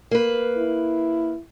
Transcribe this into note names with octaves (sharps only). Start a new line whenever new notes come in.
A#3 B4
E4